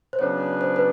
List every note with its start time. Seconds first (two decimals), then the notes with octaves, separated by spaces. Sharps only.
0.13 C5
0.19 C#3 F#3 B3 D4 C#5
0.61 C5
0.76 B4